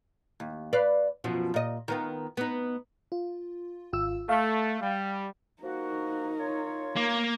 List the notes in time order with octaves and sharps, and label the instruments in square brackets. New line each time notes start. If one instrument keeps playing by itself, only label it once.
[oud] D#2
B4 D5 F5
F#2 B2 F3
A#2 D#5
D#3 B3 F4
B3 D#4
[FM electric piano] F4
G#1 F4 E6
[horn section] A3 [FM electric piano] F5
[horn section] G3
[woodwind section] F3 A#3 F#4 [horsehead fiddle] D#4 A#4
[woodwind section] F4 C#5
[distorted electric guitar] A#3